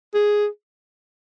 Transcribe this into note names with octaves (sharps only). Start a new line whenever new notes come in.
G#4